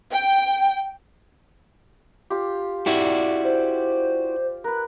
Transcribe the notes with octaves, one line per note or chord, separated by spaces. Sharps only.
G5
F4 G4
E4 F#4 G4 D5
C5
A#4 B4 F#6